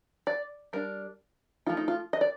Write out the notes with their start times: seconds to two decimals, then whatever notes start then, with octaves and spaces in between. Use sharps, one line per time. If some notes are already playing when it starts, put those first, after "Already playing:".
0.27 D5
0.73 G3 D4 A#4
1.66 F3 A3 D#4 F4
1.77 D#4
1.88 F4
2.13 D#5
2.21 D5